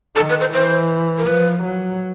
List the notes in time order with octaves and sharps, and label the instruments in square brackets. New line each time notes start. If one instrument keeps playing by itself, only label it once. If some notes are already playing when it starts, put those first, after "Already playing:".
[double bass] D#3 [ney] A4
[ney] B4
C5
[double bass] E3 [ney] C5
[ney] A#4
[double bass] F3 [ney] B4
[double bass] F#3